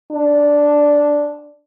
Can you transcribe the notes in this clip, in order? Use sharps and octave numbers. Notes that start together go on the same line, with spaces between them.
D4